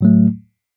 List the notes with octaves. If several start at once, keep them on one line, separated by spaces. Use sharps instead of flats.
A2 F#3 A3